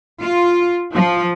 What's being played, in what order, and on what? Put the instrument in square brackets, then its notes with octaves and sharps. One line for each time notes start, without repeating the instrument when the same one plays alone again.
[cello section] F4
F3